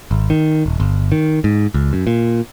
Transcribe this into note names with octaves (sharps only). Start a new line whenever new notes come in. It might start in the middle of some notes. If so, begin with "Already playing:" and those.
G#1
D#3
D#1
G1
D#3
G#2
C#2
F#2
A#2